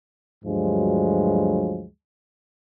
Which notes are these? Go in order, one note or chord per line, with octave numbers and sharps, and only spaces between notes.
D2 G2 F3 F#3 G#3